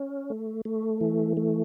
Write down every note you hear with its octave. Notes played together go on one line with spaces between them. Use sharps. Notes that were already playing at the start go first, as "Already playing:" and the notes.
Already playing: C#4
A3
A3
E3
A3